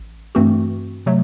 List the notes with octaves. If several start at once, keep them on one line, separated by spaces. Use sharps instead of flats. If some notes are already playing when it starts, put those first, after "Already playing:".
Already playing: A1
G2 E3 A3 C4 F#4
C3 F#3 A3